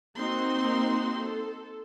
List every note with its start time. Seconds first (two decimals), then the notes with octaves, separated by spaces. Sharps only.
0.16 A#3 C4 D#4 F#4 C6
1.18 A4